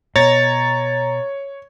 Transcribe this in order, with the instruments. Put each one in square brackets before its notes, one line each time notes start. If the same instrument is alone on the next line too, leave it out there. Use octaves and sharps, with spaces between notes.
[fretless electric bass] B2 [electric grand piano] C#5 [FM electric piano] A#5 A6